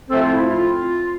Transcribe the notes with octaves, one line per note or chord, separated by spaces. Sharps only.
A2 F3 A3 C4 A4
F4
E4
F4